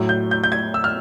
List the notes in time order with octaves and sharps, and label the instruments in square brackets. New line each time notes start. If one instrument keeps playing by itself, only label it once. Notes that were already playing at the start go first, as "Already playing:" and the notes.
Already playing: [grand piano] A2 F#3
G6
G6
G6
G#6
E6
F6